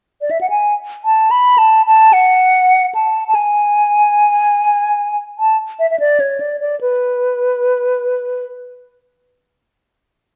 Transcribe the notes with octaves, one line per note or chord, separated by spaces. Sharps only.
D5
E5
F#5
G#5
A5
B5
A5
A5
F#5
A5
A5
G#5
A5
E5
E5
D5
C#5
D5
D5
B4